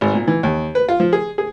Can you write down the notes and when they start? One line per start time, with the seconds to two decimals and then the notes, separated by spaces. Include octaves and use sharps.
0.01 G#1
0.14 A#2
0.28 E3
0.43 D#2
0.75 B4
0.89 F4
1.00 F3
1.13 G#4
1.38 G#4